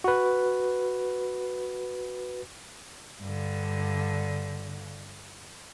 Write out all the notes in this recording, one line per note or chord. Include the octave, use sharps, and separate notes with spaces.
F#4 B4
G2 D3